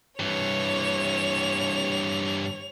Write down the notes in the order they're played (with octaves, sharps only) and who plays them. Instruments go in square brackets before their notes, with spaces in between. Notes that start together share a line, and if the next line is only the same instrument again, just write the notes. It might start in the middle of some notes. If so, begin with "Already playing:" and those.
[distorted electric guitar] G2 E3 [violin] C#5 F7